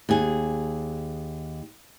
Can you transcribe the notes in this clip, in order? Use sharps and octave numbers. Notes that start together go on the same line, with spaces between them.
D#2 G#4